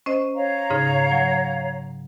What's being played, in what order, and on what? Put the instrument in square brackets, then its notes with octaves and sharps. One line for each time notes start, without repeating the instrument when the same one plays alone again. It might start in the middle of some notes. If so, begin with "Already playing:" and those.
[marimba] C#4 C5 D#5
[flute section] C#5 F5 A#5
[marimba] G#2 C#3 D#4
F#3